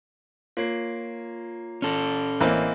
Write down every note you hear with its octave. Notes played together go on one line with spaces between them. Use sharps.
A#3 F4 C#5 C7
C#4 A4
A1 E3 A#3 C4 D#5